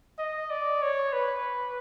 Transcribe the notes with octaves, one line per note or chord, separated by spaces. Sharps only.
D#5
D5
C#5
B4